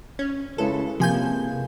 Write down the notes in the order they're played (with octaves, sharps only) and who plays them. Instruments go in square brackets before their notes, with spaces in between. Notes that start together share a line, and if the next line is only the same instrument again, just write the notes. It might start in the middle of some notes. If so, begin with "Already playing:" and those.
[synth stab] C#4
[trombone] C#3 [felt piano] G#3 E4 B4 [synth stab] A4
[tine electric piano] C3 [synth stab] F3 G#5 G6 [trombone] A#3